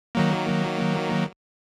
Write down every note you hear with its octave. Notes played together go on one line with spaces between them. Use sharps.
D#3 F#3 A#3